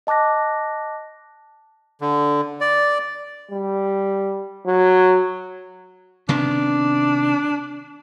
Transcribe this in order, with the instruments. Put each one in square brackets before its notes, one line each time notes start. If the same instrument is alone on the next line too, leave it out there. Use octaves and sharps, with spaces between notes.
[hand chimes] D#5 A5 D6 F#6 A#6
[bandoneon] D3
D5
[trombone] G3
F#3
[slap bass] C3 D#3 B3 [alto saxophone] D4